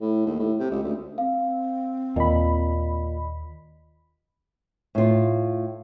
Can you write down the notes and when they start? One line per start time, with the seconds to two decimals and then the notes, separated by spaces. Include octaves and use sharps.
0.01 A2
0.26 D#2
0.39 A2
0.59 C3
0.71 C#2
0.84 D2
1.18 C4 F5
2.16 D#2 A#2 D#5 B5
4.95 A2 F4